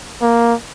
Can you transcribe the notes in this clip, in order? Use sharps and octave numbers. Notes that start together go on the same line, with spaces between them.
A#3